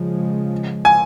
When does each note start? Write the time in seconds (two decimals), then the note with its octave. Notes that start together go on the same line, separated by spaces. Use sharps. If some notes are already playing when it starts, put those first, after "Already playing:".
Already playing: C#3 F3 G#3
0.85 G#5